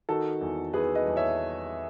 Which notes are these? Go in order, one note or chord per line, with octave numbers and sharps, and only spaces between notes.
D#3 F#4 A4
E2
E2 G#4 B4
B4 D#5
E2
C#5 E5